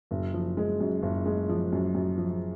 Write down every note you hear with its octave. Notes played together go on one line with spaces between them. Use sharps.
F#1
F3
G#3
F#2
F#1
G#3
F3
F#2
F#2
F3